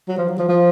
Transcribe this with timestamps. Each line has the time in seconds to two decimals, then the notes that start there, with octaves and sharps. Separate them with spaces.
0.08 F#3
0.18 F3
0.28 F#3
0.38 F3
0.49 F3